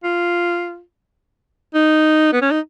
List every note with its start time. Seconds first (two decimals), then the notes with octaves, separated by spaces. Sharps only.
0.04 F4
1.75 D#4
2.33 B3
2.42 C#4
2.51 D#4